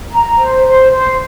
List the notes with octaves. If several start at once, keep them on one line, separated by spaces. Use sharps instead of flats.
A#5
C5
C5
C5